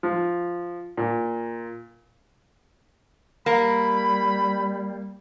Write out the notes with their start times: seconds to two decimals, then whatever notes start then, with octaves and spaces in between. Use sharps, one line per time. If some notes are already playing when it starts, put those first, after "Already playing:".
0.03 F3
0.97 A#2
3.46 G3 A#3 B5